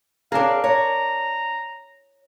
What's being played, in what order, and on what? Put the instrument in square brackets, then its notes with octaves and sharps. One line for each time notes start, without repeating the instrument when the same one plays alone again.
[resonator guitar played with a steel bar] D4 A#4 [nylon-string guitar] G#4 C#5 [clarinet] F5
[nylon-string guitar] C#5 [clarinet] A#5